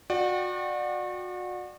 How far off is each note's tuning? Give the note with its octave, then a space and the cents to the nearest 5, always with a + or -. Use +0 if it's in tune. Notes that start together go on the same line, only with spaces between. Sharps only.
F#4 -35 D5 +25 G5 -30